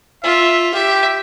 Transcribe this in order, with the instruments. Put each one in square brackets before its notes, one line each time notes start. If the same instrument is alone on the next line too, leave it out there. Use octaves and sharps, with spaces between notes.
[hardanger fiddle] F4 [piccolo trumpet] E5
[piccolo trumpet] G4 [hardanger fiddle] E5